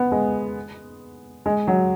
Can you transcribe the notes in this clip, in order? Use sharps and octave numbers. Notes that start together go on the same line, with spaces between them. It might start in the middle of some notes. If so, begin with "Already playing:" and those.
Already playing: B3
G#3
G#3
F#3